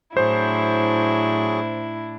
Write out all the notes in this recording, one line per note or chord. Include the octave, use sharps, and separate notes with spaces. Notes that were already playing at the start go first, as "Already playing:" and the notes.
A2 F#3 D4 E4 G#4 C5 C#6